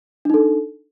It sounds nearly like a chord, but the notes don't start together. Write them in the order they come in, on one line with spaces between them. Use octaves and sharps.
D4 D#4 A4